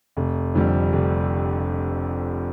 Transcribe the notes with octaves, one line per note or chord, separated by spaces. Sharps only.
F1
F2 D3 G3
F1